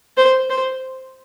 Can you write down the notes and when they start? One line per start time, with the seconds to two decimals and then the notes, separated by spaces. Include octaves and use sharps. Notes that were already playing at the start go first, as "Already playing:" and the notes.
0.17 C5
0.50 C5